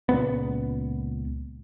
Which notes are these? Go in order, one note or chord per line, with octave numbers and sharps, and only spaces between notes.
C#2 A#2 B3